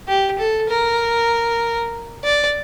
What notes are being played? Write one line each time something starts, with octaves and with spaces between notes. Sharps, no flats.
G4
A4
A#4
D5